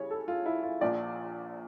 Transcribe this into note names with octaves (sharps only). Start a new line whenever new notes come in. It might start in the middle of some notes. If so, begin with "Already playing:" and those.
Already playing: C#3 E3 G3 C#5
A4
F4
E4
F4
A#1 A#2 F3 D5